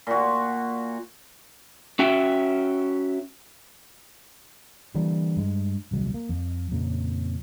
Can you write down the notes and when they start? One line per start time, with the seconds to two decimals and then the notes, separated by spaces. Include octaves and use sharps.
0.07 A#2 F#4
1.99 C#4 F#4 E5 G5
4.95 D3 E3 G3 A#3
5.37 G2 G#3
5.91 D#1 C2 F#3 G#3
6.14 A#3
6.29 F2
6.71 F2 A#2 C#3